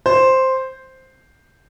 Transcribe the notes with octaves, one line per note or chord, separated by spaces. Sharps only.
C5